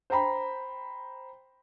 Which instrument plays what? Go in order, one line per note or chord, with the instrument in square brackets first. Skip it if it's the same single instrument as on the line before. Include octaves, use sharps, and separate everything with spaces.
[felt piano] C5 G5 A#5 B5